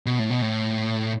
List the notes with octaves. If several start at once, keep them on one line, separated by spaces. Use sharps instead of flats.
B2
A2
B2
A2